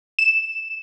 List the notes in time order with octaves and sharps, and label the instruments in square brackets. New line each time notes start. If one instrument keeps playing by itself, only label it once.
[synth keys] E7